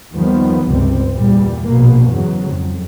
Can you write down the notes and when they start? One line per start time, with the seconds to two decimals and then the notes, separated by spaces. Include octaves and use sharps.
0.14 D#2 D#3 F3 G3 B3
0.67 G1 C#2 C3 G3 C4
1.12 E2 A#2 G3
1.68 A#1 B2 A#3
2.12 E2 G#2 C#3 F#3
2.48 F2